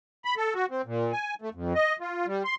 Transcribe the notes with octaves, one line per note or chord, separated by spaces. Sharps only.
B5
A4
F#4
C4
A#2
G#5
A3
F2
D#5
F4
G3
C6